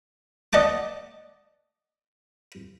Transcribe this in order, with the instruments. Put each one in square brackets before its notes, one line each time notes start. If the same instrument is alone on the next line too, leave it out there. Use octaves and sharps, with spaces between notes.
[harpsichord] D5 D#5 F#5 A5 D6